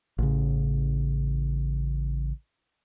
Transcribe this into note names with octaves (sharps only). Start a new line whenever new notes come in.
A1 C#3